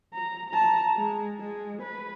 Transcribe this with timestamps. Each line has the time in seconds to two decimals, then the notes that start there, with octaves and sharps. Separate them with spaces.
0.14 A#5
0.50 A5 A#5
0.96 G#3
1.40 G#3
1.82 B4